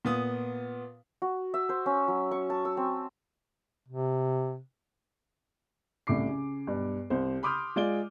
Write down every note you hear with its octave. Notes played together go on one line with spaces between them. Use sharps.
A#2 B3 D#6
F#4
E5
C5
C#4
F#3
C#6
A5
E6
C4
C3
C2 A2 C#3 D6 C7
C#3
B1 G2
C2 C5
B5 C6 D6 D#6 F6 G6
G#3 F4 D5 D7 G7